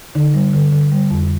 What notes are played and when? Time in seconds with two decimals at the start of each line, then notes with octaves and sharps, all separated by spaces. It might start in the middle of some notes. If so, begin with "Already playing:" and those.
0.15 D3 D#4
0.34 G3
0.53 D3
0.72 D3
0.91 G3
1.11 F2